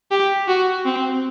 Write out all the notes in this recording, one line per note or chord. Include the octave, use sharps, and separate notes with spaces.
G4
F#4
C4